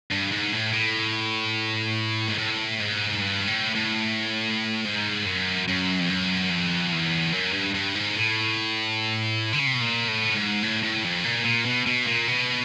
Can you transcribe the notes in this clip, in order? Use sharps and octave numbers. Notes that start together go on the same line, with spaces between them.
G2
G#2
A2
A2
G#2
A2
G#2
G2
A2
A2
G#2
F#2
F#2
F2
F#2
F2
E2
F#2
G2
G2
G#2
A2
D3
C#3
C3
B2
A#2
A2
G#2
A2
A2
F2
A#2
A#2
B2
B2
A#2
B2